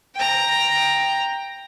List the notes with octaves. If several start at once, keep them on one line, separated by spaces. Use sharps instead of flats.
G5 A#5